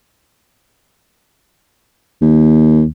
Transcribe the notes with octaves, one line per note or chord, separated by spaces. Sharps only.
D#2